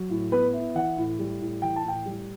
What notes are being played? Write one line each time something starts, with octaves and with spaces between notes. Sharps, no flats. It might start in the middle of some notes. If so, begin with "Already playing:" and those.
Already playing: F#3
A2
B3 B4
E4
E3 F#5
A2
G3
A2
E3 G5
A5
A2 G5
G3